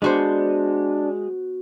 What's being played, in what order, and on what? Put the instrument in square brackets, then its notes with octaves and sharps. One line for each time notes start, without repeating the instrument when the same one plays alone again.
[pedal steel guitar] G#3 [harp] B3 F#4 C5 [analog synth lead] D4